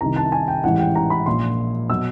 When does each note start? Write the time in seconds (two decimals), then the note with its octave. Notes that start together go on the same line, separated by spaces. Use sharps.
0.01 C2 C3 D#3 A#5
0.16 A5
0.32 G#5
0.48 G5
0.64 A1 G#2 E3 G3 F#5
0.80 G5
0.95 A#5
1.10 B5
1.26 A#1 A#2 F3 C6
1.89 B2 F#3 E6